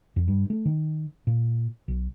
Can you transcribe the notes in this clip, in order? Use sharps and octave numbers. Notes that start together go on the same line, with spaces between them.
F2
G2
A3
D#3
A#2
B1